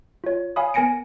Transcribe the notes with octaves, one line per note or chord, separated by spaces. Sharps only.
F4 C#5
C#5 F5 G#5 B5 D#6
B3 A#4 G#5 A#6 C#7 D7